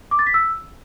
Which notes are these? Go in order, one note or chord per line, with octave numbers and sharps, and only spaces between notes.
D6
A6
B6
E6